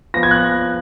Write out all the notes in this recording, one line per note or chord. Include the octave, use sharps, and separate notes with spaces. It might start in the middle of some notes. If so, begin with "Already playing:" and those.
F3 B3 F4 A#6
G#6
F#6